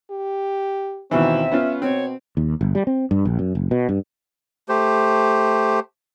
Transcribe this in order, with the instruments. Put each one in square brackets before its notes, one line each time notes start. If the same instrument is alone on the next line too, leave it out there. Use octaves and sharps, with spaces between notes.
[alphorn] G4
[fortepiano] D#2 B2 E3 [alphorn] C4 [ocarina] E5
[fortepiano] B3 C#4 F4
[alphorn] B2 [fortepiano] C4 [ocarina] C#5
[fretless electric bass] D#2
G1
G3
C4
G2
A#1
F#2
F#1
B2
G2
[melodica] A3 G4 C5